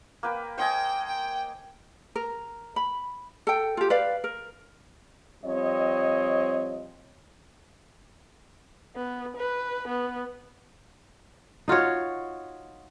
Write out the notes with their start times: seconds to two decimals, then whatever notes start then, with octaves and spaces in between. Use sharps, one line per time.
0.23 A#3 B4 G5
0.58 C5 D#5 G5 G#5
1.07 G5
2.15 A#4
2.76 B5
3.47 A4 G5
3.77 F4 G4
3.90 B4 D5 F5
4.24 A#4
5.44 F3 G3 C4 C#5 D#5
8.96 B3
9.37 B4
9.88 B3
11.68 D#4 F4 F#4 C#5